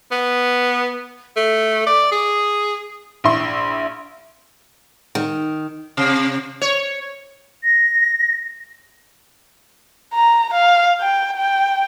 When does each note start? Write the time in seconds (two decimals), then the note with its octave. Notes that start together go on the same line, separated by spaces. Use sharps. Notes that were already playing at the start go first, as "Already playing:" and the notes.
0.12 B3
1.36 A3
1.86 D5
2.12 G#4
3.24 A#1 E4 C6
5.15 D#3
5.97 C3
6.62 C#5
7.63 A#6
10.14 A#5
10.54 F5
11.01 G5
11.37 G5